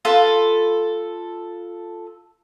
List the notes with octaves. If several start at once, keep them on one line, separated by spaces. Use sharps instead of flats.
F4 A4 B4